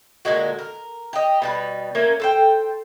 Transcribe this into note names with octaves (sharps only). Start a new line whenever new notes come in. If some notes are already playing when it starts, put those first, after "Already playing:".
A#2 D3 G#3 F#4
A#4
G4 D#5
B2 G3 B4
A3 A#3 C#4
A4 C5 G5